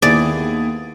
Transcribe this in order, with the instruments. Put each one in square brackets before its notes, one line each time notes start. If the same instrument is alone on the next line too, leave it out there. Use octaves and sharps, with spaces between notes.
[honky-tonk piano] D#2 [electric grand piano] B3 E4 G#4 [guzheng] D5